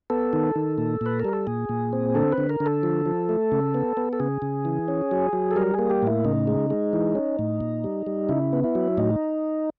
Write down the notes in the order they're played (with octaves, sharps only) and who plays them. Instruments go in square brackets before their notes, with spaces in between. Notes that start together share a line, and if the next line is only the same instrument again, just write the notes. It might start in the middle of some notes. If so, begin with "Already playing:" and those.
[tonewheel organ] B3 A4
D#3
D#3
A#2
A#2 B4
G3 A#4
A4
A#2 G#4
A#2
C4
D3 A4
B4
D3
A#4
D3
A4
F3
F3
A3
C#3
B3
B3
A4
C#3 G#4
C#3
E3
C#4
F#3
F#3
A4
G3 A#4
A#3 G#4
G4
A2 E4
C#3 D#4
G#3
G#3
E3
C#4
A2
A#2
G3
G3
C#3 E4
B3
E4
F#3
A2 D#4